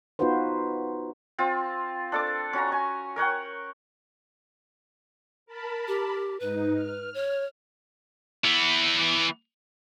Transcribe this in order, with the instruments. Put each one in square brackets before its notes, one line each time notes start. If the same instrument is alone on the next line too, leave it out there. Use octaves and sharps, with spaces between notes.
[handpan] B3 D#4 F4 F#4 B4 C5
[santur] C4 F4
D4 A4 D6
C#4 F#4 A#5
G#5 C#6
A#4 C#5 F#5 G5
[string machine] A#4 A5 B5
[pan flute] G4
[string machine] G#2 D#4 [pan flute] B4
[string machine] F6
[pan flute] C#5
[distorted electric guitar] E3 B3